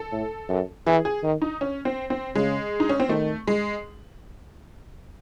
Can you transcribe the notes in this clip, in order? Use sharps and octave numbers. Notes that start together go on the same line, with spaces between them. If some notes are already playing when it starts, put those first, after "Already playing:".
Already playing: A4
A2
F#2
E3 G#4
G#4
D#3
D#4
C#4
C4
C4
C#3 G#3
D#4
C#4
C4
D#3 A3
G#3